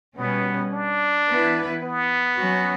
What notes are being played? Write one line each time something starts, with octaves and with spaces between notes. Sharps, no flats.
B2 G3 B3 C#4
D4
E3 B3 E4 B4
B3
F#3 C#4 F#4